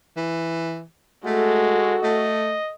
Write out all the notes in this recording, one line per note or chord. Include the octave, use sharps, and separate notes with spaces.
E3
G#3 A3 F#4 A4
A3 D#5